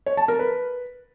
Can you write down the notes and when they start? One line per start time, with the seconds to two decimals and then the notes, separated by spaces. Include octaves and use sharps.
0.06 C#5
0.17 A5
0.28 A#4
0.39 B4